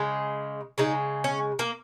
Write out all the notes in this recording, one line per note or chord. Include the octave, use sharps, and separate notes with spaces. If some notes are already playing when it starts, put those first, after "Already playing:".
Already playing: C#3 G#3
C#3 G#3 D#4
C#4
A#3